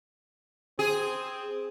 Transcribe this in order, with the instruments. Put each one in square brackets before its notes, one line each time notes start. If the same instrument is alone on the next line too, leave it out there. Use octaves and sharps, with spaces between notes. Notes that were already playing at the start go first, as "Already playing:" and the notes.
[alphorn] C4 [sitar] G#4